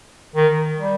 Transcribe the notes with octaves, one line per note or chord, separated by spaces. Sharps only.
D#3
G3